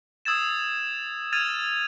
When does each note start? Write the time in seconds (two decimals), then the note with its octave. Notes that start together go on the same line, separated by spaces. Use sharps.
0.25 D#6 E6 G#6 A6 E7
1.32 F6 G#6 A6 D#7 F7